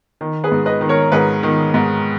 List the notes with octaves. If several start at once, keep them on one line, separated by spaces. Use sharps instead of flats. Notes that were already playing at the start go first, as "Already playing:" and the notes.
D#3
G#4 B4
G#2
B4 D#5
D#3
A#4 C#5
G#2 G#4 B4
D#3
G#2